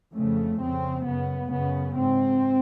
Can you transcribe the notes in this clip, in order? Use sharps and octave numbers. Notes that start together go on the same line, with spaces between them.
F2 C#3 A3
F2 C#3 C4
F#2 C#3 B3
F#2 C#3 B3
G#2 C4